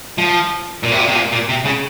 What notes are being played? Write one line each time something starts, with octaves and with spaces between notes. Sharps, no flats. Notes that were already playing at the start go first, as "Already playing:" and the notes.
F3
A#2
C3
A#2
C3
A#2
A#2
C3
C#3